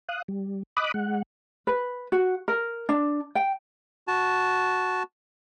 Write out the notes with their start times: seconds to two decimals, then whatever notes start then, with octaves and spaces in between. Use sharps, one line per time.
0.09 F5 D#6 F#6
0.28 G3
0.77 D#5 B5 D6 D#6 F#6
0.94 G#3 F#5
1.67 B4
2.12 F#4
2.48 A#4
2.89 D4
3.35 G5
4.08 F#4 A5